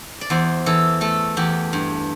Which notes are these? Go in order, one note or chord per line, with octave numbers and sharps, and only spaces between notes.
D5
E2 C5
E3 A4
A3 A4
E2 G4
G2